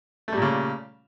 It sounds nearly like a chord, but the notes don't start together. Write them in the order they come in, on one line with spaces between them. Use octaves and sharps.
A3 G3 A#2 C#3